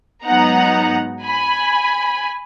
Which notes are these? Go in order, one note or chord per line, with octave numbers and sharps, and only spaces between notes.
G#2 F#3 B3 D#4 F#5 A#5
G#5 B5